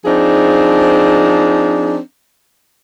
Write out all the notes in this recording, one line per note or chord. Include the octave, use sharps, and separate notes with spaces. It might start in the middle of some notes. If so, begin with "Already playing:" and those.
F3 C4 D4 D#4 G#4